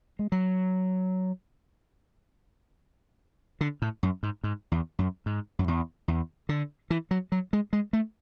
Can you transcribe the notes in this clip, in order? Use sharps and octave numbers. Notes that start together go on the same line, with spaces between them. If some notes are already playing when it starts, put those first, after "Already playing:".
G#3
F#3
D3
A2
F#2
G#2
G#2
E2
F#2
G#2
F#2
E2
E2
D3
E3
F#3
F#3
G#3
G#3
A3